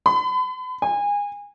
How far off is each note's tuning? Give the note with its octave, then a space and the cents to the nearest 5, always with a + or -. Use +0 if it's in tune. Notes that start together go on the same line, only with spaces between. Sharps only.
B5 +40
G#5 -25